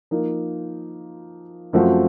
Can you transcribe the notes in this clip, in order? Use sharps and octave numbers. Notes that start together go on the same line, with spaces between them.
F3 A#3 D#4 A#4
F#2 F3 A3 C4 F#4